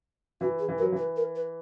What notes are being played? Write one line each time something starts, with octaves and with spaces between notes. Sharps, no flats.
E3 F#4
G#4
E3
F#3 A#4
E3 B4
A#4
B4